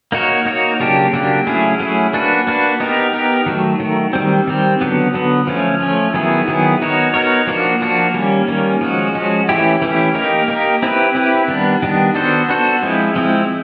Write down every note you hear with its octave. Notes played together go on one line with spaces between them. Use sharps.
A#3 D#4 F#4 A#4 C#5
A#3 D#4 F#4 A#4 C#5
C#3 F#3 A#3 D4 G4
C#3 F#3 A#3 D4 G4
F#3 A3 C#4 E4 G#4
F#3 A3 C#4 E4 G#4
A#3 D4 F#4 B4
A#3 D4 F#4 B4
B3 D#4 G4 A#4
B3 D#4 G4 A#4
D#3 F#3 A3
D#3 F#3 A3
D#3 G3 C4
D#3 G3 C4
D3 F#3 B3
D3 F#3 B3
F3 A3 C#4
F3 A3 C#4
D#3 F#3 B3 E4 G#4
D#3 F#3 B3 E4 G#4
B3 D#4 F#4 A#4 C#5
B3 D#4 F#4 A#4 C#5
F3 A#3 D4 F#4
F3 A#3 D4 F#4
D#3 G3 A#3 C#4
D#3 G3 A#3 C#4
F3 G#3 C#4 F#4
F3 G#3 C#4 F#4
E3 A3 C#4 E4 G4
E3 A3 C#4 E4 G4
A#3 D#4 G4 A#4
A#3 D#4 G4 A#4
C4 E4 G4 B4
C4 E4 G4 B4
D#3 G3 B3 D4
D#3 G3 B3 D4
B3 D4 F#4 A4 C5
B3 D4 F#4 A4 C5
F3 G#3 C4 E4
F3 G#3 C4 E4